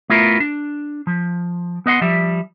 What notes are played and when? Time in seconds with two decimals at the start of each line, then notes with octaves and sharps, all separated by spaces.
0.10 A3 B3 E4 F4 A#4
0.40 D4
1.07 F3
1.86 B3 D#5 F#5 C6
2.01 F3 G3 E5